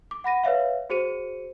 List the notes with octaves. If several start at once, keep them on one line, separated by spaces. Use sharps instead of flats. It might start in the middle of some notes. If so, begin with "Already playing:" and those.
D6
F#5 B5 A#6 D#7
B4 C#5 E5 F5
F#4 G#4 C5 C#7 D#7